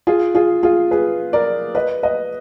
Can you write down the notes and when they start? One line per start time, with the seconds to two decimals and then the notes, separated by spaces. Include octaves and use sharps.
0.07 F4 G#4
0.35 F4 G#4
0.63 F4 G#4
0.91 G#4 B4
1.33 A#4 D5
1.75 B4 D#5
2.03 B4 D#5